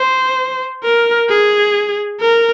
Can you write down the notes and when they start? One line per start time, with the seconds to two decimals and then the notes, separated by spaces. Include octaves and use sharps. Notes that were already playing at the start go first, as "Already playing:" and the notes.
Already playing: C5
0.84 A#4
1.29 G#4
2.21 A#4